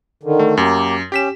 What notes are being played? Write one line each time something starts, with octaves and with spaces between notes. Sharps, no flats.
D3 D#3
A3
F#2 A#3 G4
C#4 G4 B6 E7